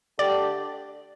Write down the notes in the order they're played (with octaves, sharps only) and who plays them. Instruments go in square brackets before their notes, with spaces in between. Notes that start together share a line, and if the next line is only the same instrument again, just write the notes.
[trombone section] D3 A3 D4 G4 [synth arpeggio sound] D5